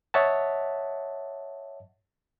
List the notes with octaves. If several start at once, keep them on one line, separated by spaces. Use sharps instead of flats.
C#5 D#5 E5 F#5 A5